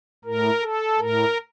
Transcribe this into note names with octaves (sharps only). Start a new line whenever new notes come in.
A2 A#4
A4
A2 A#4